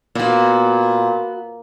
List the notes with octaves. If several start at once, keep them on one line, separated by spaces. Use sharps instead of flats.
A#2 B3 F#4